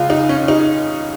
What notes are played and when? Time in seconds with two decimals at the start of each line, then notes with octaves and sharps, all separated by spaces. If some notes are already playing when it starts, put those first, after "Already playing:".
Already playing: C#2 F4
0.10 D#4
0.29 C#4
0.48 D#4